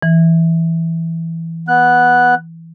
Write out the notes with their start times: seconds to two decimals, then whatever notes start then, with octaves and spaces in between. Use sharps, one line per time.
0.02 E3
1.68 B3 F#6